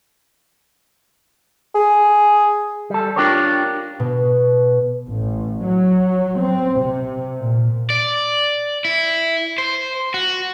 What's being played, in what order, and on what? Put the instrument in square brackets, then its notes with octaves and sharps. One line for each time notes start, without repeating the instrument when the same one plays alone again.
[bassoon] G#4
[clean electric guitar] G3 A4
D4 F4 G4 A#4 C#5
[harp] B2
[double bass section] A1
F#3
C4
C3
A#2
[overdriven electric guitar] D5
E4
C5
F#4